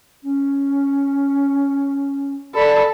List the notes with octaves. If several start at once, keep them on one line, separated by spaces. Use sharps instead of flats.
C#4
A4 D5 B5